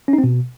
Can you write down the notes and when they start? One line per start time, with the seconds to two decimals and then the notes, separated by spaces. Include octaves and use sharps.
0.08 C#4
0.13 D#4
0.18 C4
0.24 B2